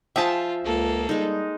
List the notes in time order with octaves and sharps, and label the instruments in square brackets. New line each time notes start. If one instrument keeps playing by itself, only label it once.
[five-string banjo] F3 G#4 G5 [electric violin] F4 [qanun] E5 A5
[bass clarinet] C#2 [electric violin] A#3 A4
[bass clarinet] G3 [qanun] G#3 D#4